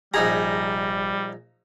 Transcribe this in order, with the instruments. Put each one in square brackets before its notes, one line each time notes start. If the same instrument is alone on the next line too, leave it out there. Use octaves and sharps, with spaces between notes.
[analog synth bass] F1 [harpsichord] A#1 D#4 A#5 [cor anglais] G3 [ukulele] G#4